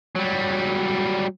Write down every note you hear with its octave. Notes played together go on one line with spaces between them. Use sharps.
F#3 G3